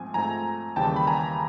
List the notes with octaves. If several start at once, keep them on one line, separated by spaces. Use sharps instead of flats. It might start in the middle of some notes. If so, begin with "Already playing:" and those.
Already playing: G#2 F3 A3 C4 G#5
G#2 F3 A3 C4 G#5 A#5
D#2 C#3 E3 G3 G5 A5
B5
G#5 A#5